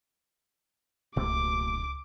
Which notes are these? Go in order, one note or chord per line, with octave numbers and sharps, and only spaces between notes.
D1 C#2 B2 A3 A#3 D6